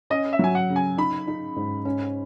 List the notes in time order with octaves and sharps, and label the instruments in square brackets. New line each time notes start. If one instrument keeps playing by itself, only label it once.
[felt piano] C#4 [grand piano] D#5
[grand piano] E5
[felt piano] F#3 [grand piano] G#5
[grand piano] F#5
[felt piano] C#3
[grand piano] G#5
[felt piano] D#4 [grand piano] B5
[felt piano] D#4
G#2
C#4